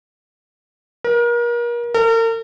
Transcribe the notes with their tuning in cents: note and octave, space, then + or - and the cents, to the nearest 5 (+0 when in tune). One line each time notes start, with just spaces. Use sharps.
A#4 +35
A#4 -40